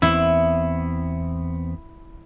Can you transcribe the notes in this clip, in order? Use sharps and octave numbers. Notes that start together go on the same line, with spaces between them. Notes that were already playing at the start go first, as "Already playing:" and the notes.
E2 B3 C4 E4